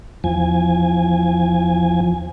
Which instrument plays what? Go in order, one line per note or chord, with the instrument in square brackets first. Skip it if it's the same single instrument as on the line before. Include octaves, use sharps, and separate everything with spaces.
[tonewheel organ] E2 F3 G#5